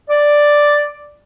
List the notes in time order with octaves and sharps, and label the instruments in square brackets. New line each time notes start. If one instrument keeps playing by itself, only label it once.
[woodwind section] D5